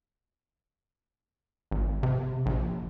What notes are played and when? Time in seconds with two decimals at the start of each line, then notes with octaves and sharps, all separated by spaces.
1.71 G#1
2.03 C3
2.46 A#1